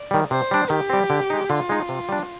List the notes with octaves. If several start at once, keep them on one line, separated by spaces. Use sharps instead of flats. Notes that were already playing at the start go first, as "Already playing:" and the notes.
Already playing: D5
D#3 G3
C3 C5
G3 D4
D#3 G4
G3 C4
D3
G#3 D#4
D3 F4
G#3 D#4
C3
G3 D4